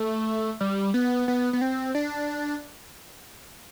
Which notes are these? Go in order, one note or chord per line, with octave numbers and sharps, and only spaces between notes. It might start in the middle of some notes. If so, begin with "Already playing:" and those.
Already playing: A3
G3
B3
B3
B3
C4
D4